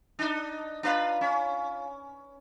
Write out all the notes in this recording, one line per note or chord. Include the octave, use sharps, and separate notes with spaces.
D4 D#4
D4 F4 B4 F5 A#5
C#4